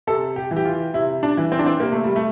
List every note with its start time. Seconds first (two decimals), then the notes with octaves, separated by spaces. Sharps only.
0.07 C3 A4
0.36 G4
0.51 E3
0.57 G4
0.65 F4
0.94 C3 E4
1.23 D4
1.37 E3
1.52 C4
1.59 D4
1.66 C4
1.80 C3 A#3
1.92 A3
2.04 G3
2.16 A3